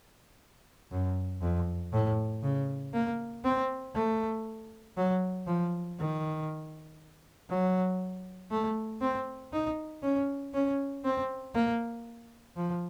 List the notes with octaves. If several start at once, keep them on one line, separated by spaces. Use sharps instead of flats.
F#2
F2
A2
C#3
A#3
C4
A3
F#3
F3
D#3
F#3
A3
C4
D#4
C#4
C#4
C4
A#3
F3